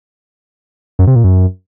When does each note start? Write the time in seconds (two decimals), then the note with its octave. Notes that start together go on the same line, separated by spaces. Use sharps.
0.99 F#2
1.07 C3
1.16 A#2
1.24 F#2